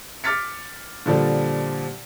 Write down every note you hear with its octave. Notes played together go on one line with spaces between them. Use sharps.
D6 F6 A6 B6 C#7
A#2 D3 F3 G3